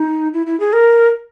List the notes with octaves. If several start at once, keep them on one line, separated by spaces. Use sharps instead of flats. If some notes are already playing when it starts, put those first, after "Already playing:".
Already playing: D#4
E4
E4
G#4
A#4